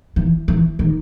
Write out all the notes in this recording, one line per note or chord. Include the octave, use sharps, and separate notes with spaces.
E3
E3
D#3